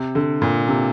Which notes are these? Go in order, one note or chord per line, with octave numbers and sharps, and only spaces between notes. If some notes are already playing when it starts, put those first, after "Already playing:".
Already playing: C3
D3
A#2
C3